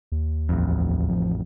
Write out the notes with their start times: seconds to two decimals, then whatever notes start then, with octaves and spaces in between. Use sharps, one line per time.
0.12 D#2
0.49 A1 F2
1.10 F3